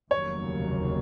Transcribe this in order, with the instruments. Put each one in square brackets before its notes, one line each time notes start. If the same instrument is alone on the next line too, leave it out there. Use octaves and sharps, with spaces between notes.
[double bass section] F1 D#2 C#3 F#3 A#3 [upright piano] C#5